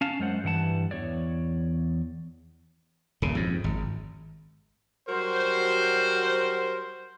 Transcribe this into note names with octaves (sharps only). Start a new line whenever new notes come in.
C#4 F5 A5
F#2 G#3 C5 F#5
G2 E3 F#5 A5
E2 C#5 D5
D#1 C#3
F2 G#2
G#1
F#3 G3 F#4 A#4 C5